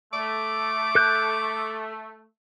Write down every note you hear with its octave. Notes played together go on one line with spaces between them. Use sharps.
A3 D6
A4 F#6 G6